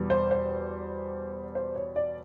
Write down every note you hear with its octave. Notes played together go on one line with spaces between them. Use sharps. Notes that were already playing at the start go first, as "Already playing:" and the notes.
Already playing: E2 B2 G3
C5
C5
C5
C#5
D5